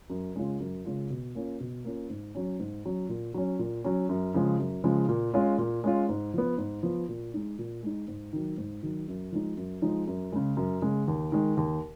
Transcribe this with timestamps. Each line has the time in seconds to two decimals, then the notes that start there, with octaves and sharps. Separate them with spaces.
0.10 F#2
0.35 C#3 G#3 C#4 F4
0.60 F#2
0.85 C#3 G#3 C#4 F4
1.10 B2
1.35 A#3 C#4 F4
1.60 B2
1.84 A#3 C#4 F4
2.10 G#2
2.35 F#3 C#4
2.59 G#2
2.85 F#3 C#4
3.09 A#2
3.34 F#3 C#4
3.59 A#2
3.84 F#3 C#4
4.09 F#2
4.34 C#3 F3 G#3
4.59 F#2
4.84 C#3 F3 G#3
5.09 A#2
5.34 G#3 C#4 F4
5.58 A#2
5.84 G#3 C#4 F4
6.09 G#2
6.34 F3 B3
6.58 G#2
6.83 F3 B3
7.09 A#2
7.34 G#3 D#4
7.59 A#2
7.83 G#3 D#4
8.08 G#2
8.33 D#3 F#3
8.57 G#2
8.83 D#3 F#3
9.08 F#2
9.32 F3 G#3 D#4
9.57 F#2
9.82 F3 G#3 D#4
10.07 F#2
10.32 C#3 G#3
10.57 F#2
10.82 C#3 G#3
11.08 D#2
11.32 D#3 G#3
11.57 D#2